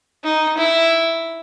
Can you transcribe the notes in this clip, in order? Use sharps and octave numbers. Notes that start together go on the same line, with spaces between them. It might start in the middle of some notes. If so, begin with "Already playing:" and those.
D#4
E4